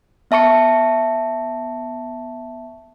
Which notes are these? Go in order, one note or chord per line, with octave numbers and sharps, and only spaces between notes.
B3 E5 A5 C#6 C#7